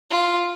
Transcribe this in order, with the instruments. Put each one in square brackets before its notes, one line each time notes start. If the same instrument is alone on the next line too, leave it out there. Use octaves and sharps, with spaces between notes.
[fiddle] F4